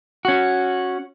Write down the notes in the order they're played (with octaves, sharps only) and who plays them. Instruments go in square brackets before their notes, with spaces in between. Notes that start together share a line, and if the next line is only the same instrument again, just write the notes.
[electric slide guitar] C#4 F#4